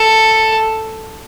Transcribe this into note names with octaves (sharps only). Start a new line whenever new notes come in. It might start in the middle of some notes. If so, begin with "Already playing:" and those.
Already playing: A4